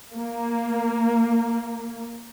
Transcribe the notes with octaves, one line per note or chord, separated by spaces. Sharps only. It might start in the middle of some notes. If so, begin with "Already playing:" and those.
A#3